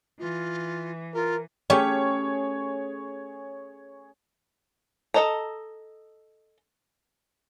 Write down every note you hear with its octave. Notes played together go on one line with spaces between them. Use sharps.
E3 F4
F4 A#4
A3 C#4 G4 G#4 C#5
A4 C5 D#5 A5 A#5